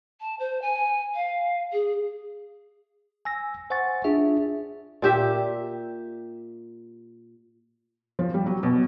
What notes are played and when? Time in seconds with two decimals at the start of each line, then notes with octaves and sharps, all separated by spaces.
0.21 A5
0.40 C5
0.62 G#5
1.15 F5
1.73 G#4
3.25 G#5 E6 A#6
3.70 C5 F#5 G#5 C#6 A6
4.04 D4 F4 G#4 E5
5.02 A#2 G4 E5
8.19 F3
8.34 G3
8.46 F#3
8.63 B2